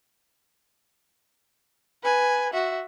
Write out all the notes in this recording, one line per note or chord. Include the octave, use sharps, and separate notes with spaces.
B4 G#5
F#4 E5